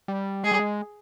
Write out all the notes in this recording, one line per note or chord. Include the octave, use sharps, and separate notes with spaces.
G3
G#3 G#4
G3
G#3